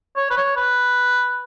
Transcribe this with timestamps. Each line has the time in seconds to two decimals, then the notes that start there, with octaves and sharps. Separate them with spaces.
0.16 C#5
0.30 B4
0.37 C#5
0.57 B4